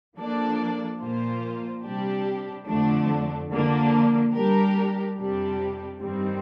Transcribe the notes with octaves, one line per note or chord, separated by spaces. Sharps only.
F3 A#3 D4 A4 D5
A#2 F3 A#3 F4 C5
C3 G3 D4 G4
F2 D3 F3 A3 D4
D3 F3 A#3 D4
G3 D4 G4 A#4
F2 C3 G3 D4 G4
G2 D#3 G3 C4